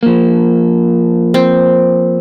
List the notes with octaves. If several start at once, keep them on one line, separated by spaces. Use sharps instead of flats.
F3 A#3
C4